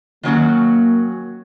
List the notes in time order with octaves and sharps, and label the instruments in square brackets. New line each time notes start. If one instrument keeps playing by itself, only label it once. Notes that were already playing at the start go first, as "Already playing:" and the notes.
[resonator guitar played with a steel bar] D#3 F#3 C#4 F#4 [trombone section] A#3